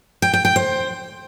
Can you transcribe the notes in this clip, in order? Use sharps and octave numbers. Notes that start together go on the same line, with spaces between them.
G5
G5
G5
C5